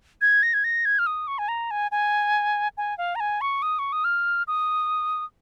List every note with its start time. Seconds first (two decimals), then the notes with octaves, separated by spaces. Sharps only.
0.21 G#6
0.43 A#6
0.54 G#6
0.64 A#6
0.85 G#6
0.99 F6
1.07 D#6
1.28 C#6
1.39 G#5
1.48 A#5
1.71 G#5
1.92 G#5
2.77 G#5
2.98 F5
3.16 A#5
3.20 G#5
3.41 C#6
3.62 D#6
3.79 C#6
3.92 D#6
4.04 F6
4.48 D#6